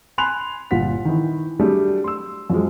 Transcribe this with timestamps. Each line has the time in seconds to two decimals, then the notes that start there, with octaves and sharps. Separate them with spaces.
0.18 G#5 B5 C6 F#6 F7
0.71 G1 A#2 F4 F#5 B6
1.05 D#3 E3
1.59 F#3 G3 A3 D4 G4 G#4
2.04 C6 E6
2.50 F#2 F3 F#3 G#3